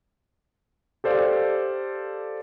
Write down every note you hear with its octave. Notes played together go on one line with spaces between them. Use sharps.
G4 A4 C5 D5 F5